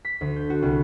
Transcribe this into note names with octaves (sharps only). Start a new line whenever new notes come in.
B6
D2
G6
F#4
C2